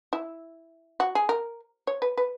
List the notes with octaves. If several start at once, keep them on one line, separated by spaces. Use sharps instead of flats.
E4
F#4
G#4
A#4
C#5
B4
B4